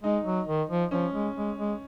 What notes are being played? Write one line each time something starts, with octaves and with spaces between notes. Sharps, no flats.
G#3 D#4
F#3
D#3
F3
F3 C#4
G#3
G#3
G#3